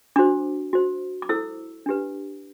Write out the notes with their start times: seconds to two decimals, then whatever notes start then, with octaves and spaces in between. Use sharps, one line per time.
0.16 D4 F#4 C5 D6
0.73 F#4 C5
1.22 D6
1.29 E4 A4 C5 E6
1.86 D4 G4 B4